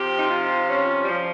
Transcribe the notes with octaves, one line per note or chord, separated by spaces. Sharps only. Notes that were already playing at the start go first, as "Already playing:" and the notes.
Already playing: C3 F3 G4
D#4
F4
C#4
G3
F3